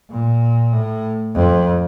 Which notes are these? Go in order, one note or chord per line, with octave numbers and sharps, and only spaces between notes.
A#2
A2
F2